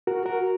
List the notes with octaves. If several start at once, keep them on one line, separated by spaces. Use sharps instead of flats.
F#4 A#4
F#4 A#4